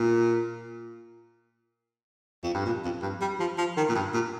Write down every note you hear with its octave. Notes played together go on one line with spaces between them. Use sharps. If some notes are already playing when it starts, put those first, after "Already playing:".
Already playing: A#2
F2
G2
A#2
F2
G2
G3
F3
F3
D#3
A#2
G2
A#2